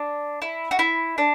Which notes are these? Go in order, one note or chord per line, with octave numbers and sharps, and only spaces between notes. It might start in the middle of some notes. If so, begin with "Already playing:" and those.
Already playing: D4
E4
F#4
E4
D4